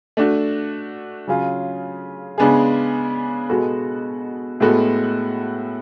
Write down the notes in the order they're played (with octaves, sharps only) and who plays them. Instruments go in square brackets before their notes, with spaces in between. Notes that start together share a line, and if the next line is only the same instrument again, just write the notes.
[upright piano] A3 D4 F#4
C#3 F#3 C#4 F4 G#4
C#3 G#3 B3 D4 G#4
B2 G#3 B3 F#4 A4
A2 G#3 B3 F#4 A4